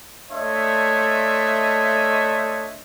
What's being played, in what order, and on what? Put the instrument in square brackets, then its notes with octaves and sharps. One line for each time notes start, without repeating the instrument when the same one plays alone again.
[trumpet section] A3 D4 C#5 D#5 E5 C6